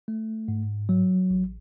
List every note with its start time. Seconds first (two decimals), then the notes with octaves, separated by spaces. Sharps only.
0.08 A3
0.48 G#2
0.89 F#3
1.31 A1